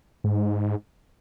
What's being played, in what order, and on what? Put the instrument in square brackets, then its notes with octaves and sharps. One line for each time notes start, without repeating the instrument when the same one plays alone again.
[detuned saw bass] G#2